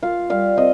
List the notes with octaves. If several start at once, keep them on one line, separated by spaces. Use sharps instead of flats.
F4 F5
G3 F5
C4 D#5